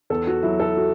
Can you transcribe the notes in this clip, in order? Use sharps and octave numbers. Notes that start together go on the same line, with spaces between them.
E2 A4
F#4
F#3 E4
A4
F#4